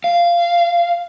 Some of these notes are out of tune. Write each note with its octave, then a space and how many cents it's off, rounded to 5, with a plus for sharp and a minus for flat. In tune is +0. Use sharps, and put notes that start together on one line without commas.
F5 -15